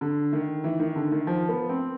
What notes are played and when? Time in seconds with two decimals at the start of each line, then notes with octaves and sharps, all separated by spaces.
0.01 D3
0.33 D#3
0.64 E3
0.80 D#3
0.96 D3
1.12 D#3
1.27 F3
1.49 B3
1.69 C4